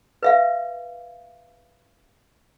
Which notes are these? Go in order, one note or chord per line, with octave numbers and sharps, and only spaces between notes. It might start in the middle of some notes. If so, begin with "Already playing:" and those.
B4 E5 F5